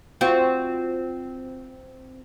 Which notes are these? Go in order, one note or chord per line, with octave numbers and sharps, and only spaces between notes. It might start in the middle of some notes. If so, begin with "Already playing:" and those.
C4 F4 F#4